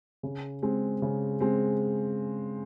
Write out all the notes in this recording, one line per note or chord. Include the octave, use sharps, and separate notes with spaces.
C#3
G#3 C4
C#3
G#3 C4